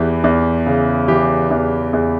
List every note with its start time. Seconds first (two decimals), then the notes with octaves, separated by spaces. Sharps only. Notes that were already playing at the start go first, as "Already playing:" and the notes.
Already playing: E2 E3 G4
0.24 E2
0.66 C#3
1.08 E3 G4
1.51 E2
1.93 E2